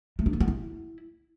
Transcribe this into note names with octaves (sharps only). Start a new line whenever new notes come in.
A3
D4
A#3
B3
E4